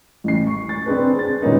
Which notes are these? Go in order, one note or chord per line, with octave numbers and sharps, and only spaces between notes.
A1 C7
C#6
A6
C4 D4 G#4 B4
A6
A#2 D#3 G#3 B3 C#4 D#4